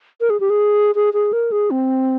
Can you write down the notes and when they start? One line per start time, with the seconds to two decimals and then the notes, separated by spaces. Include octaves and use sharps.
0.21 A#4
0.30 G#4
0.40 G4
0.50 G#4
0.95 G#4
1.14 G#4
1.33 A#4
1.52 G#4
1.71 C4